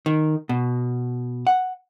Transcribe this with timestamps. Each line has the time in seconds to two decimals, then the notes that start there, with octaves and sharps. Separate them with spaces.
0.06 D#3
0.49 B2
1.47 F#5